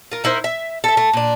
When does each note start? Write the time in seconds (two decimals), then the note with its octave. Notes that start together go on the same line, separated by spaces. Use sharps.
0.12 F4 A#4
0.24 D#4 E4 A#4 C5
0.44 E5
0.84 A4 E5
0.97 A3
1.13 A#2 D4